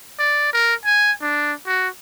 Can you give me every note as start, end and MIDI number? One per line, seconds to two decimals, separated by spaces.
0.19 0.50 74
0.53 0.75 70
0.85 1.12 80
1.21 1.53 62
1.67 1.88 66